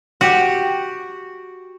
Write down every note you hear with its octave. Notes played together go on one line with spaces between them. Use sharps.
F#4 G4